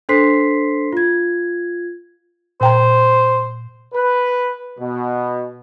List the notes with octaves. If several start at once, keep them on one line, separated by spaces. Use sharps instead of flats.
D4 A4 C5 C6 B6 C7
F4 G#6
A#2 C5 G5 A#5
B4
B2